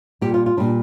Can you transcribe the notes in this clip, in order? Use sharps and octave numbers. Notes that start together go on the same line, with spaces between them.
A#2 G3 G4
F4
F4
A#2 G3 D4